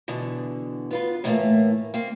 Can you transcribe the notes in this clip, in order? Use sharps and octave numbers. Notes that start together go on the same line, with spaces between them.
B2 D3 E3
B3 F4 B4
A2 E3 F3 G3 A3 A#3
A#3 C4